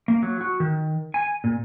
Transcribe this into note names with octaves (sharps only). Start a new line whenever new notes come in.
A#3
F#3
F#4
D#3
G#5
A#2